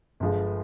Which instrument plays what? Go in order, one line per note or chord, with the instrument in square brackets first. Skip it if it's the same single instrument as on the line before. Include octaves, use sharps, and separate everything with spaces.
[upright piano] G1 G2 F3 G#3